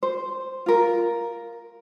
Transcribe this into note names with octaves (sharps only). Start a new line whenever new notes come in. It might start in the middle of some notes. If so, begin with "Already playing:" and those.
C5
F4 A#4